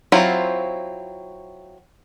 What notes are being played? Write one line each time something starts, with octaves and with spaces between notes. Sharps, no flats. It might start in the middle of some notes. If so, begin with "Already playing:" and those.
F#3 C4 E4 F4